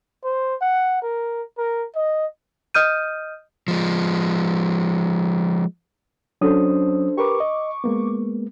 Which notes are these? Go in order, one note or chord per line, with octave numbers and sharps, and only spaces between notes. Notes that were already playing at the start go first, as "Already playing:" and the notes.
C5
F#5
A#4
A#4
D#5
D#5 D#6 F6 G6 D#7
F3 G#3
F#3 C#4 D4 A4 C5 D#6
G4 A#4 B4 C#6 D6
D#5
G#3 A#3 B3